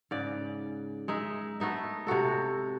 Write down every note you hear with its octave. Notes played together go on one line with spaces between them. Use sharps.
G#2 C#3 D5
G#3 D#4 E5
A3 B3 D#4 E5
C3 G#3 F#4 A4